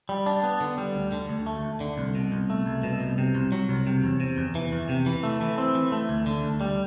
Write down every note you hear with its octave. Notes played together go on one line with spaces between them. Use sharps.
G3
D4
B3
D3
G3
D2
D3
D2
A3
D2
D3
C2
B2
C2
A3
C2
B2
C2
C3
C2
F#3
C2
C3
E2
C3
E2
E3
E2
C3
E3
A3
E3
C4
E3
A3
D2
D3
D2
G3